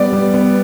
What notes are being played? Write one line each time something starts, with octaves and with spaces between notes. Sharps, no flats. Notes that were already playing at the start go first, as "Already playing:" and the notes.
Already playing: G3 B3 D5
G3
B3